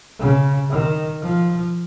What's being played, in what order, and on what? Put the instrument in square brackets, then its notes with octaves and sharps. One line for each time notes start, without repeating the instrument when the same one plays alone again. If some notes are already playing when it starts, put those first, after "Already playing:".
[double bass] C#3
D#3
F3